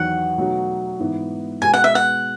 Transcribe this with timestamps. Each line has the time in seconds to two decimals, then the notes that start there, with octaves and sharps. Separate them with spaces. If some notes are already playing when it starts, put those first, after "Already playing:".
Already playing: E2 D#3 F#3 F#5
0.38 B2 F#3 A3 D#4 F#4
0.99 G#2 E3 B3 D#4 F#4
1.62 B2 G#3 B3 F#4 G#5
1.74 F#5
1.84 E5
1.95 F#5